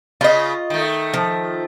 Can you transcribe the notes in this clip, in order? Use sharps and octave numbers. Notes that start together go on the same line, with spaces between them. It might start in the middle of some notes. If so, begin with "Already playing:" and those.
C#3 F4 D#5
D#3 A3
F3